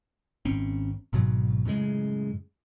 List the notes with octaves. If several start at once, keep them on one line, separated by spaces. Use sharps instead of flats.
G#1 C4 C#4
G#1 G#2 B2 F#3
F#2 A2 C#3 G#3